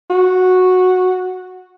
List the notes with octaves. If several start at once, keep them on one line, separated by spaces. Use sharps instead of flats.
F#4